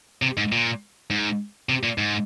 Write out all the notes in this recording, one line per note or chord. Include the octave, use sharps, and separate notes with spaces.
C3
G#2
A#2
G#2
C3
A#2
G#2